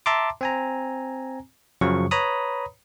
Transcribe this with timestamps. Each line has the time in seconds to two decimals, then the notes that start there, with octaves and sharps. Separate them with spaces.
0.06 E5 A5 A#5 C6 D6
0.41 C4 G#5 A#5
1.81 F#2 C#3 F3 F#3 C#6
2.11 B4 C#5 A#5 B5 D#6